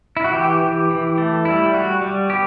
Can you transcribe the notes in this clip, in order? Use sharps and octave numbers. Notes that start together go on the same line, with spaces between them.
E4
F#4
E3 G4
E3
E3
A3
G3 E4
G3 F#4
G3
B3 G4